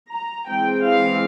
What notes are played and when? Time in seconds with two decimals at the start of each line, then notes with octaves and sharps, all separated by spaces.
0.12 A#5
0.48 E3 G#3 C4 G5
0.85 F5